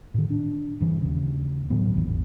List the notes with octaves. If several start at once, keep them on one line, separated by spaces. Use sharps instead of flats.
A2 D#3
D4
G2 E3
D#2 C#3
A2 D#3 F#3 B3
G#1 E2